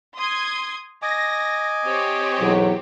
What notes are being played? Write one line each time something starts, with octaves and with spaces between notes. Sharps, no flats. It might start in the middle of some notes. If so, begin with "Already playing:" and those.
C6 D#6 G#6
D#5 G#5 D6 A#6
C4 G4 C#5
B1 E2 F#3